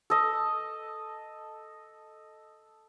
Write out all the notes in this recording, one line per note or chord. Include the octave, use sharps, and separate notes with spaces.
A4 D#5